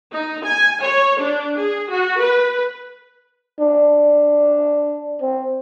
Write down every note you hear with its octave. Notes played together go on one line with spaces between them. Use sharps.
D#4
G#5
C#5
D4
G#4
F#4
B4
D4
C4